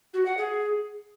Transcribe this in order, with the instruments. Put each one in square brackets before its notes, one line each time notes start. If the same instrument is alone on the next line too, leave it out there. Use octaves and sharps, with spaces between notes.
[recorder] F#4
F#5
G#4